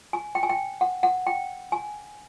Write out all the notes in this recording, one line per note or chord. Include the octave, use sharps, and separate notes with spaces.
G#5
G5
G#5
G5
F#5
F#5
G5
G#5